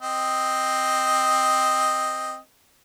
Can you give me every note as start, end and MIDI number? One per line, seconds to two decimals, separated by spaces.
0.01 2.37 60
0.01 2.37 75